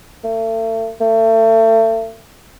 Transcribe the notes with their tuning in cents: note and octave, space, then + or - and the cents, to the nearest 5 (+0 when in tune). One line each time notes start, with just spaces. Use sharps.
A3 +35
A3 +35